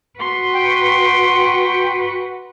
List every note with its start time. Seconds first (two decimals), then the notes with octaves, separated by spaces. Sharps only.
0.19 F#4 B4 C6
0.54 G5